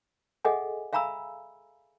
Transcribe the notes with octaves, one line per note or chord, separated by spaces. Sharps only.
G#4 A4 D#5 E5 F#5 G#5
E5 F5 G#5 A#5 B5 E6